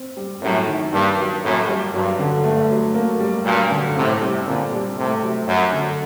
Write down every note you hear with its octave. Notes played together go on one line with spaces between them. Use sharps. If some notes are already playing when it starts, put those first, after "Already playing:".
Already playing: C4
G3
F#2 A2 G3
D#3
G2 A#3
F#3
F#2 A2 A#3
G3
G2 F#3
D3
G2 A3
F#3
A#3
G3
G2 A#2 F#3
D3
A2 C3 C4
G3
A#2 D3 C4
G3
A2 C3 A3
F#3
F#2 F#3
D3